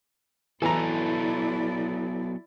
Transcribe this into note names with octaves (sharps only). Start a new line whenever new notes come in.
E3 F#3 B3 E4 A4 D5 A#5